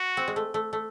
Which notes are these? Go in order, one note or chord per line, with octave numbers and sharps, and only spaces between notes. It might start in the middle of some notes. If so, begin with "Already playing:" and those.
Already playing: F#4
C4
G#3
A3
A3
A3